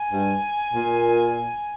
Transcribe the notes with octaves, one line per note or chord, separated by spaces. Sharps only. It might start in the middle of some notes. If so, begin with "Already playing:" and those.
Already playing: G#5
G2
A#2